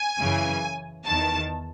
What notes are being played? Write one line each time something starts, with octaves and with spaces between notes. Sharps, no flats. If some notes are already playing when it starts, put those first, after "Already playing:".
Already playing: G#5
F#2 C#3 E3
E2 D#3 A5